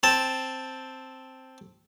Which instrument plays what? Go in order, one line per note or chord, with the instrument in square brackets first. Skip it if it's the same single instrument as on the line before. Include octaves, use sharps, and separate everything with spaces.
[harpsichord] C4 A5